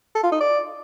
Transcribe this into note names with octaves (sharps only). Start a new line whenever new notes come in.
A4
F4
D#4
D5